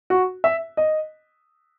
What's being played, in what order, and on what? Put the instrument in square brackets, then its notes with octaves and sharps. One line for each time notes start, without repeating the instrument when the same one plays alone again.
[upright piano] F#4
E5
D#5